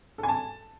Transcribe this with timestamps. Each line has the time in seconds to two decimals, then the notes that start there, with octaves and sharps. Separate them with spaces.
0.18 A4
0.23 G#5
0.28 A5